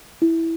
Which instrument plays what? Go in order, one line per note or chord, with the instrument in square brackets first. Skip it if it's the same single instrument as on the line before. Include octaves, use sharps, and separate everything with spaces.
[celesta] E4